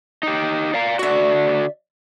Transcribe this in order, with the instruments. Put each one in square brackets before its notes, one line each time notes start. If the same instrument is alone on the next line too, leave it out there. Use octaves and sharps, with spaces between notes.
[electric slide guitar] D#4 G4
D5 F5 A#5
[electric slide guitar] D3 F#4 [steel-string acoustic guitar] D5 E5